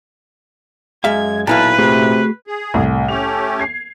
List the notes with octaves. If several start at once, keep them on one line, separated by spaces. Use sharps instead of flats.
F#2 G#3 E5 F5 G#6
B1 A#2 E4 B4 F5 A5
C3 A3 F#4 G#4
G#4
C2 A2
A3 C#4 G4 F7
G#6 C7